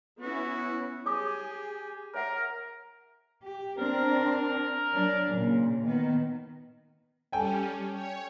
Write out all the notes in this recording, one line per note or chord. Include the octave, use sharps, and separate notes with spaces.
B3 C#4 E4 F#4
G4 G#4 C#5 G#5 D6 D#6
A#4 C#5 E5 F#5
G4
C4 D4 A#4
F#3 D4
A#2 C#3
D#3 B3
G3 C#4 A4 G5 G#5
C#5